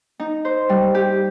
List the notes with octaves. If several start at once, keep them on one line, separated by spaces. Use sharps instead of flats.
D#4
C5
G3
G4